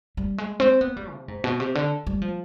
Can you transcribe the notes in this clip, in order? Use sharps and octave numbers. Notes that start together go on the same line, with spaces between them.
G3
G#3
C4
B3
G3
C3
G#2
B2
C3
D3
G3
F3